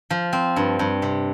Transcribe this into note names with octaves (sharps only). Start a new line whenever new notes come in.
F3
C4
G2
G2
C3